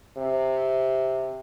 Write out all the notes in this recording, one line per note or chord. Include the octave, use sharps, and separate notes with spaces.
C3